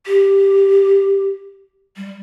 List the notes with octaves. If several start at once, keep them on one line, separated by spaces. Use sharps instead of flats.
G4
G3